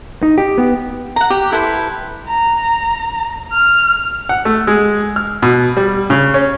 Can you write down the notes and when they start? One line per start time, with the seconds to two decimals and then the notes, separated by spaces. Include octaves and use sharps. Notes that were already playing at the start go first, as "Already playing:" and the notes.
0.23 D#4
0.38 G4
0.58 B3
1.16 F#5 A#5
1.30 G4
1.52 E4 A4 B4 C5
2.28 A#5
3.52 F6
4.29 F#5
4.45 A3
4.67 G#3
5.16 F6
5.42 B2
5.77 G3
6.10 C#3
6.34 C#4